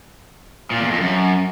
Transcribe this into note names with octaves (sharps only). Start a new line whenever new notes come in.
A#2
E2
F2
F#2